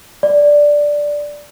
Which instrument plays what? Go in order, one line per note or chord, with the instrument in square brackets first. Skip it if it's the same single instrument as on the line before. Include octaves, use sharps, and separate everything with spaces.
[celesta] D5